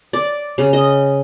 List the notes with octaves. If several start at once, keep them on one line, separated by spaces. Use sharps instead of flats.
D5
C#3
D#5